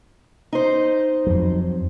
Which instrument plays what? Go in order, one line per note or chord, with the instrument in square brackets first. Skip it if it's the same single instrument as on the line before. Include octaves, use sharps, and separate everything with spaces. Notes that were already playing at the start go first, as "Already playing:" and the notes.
[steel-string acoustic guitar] D#4 C5
[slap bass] F2 F#3